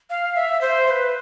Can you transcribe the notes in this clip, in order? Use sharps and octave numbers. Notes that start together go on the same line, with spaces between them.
F5
E5
C5
C5
B4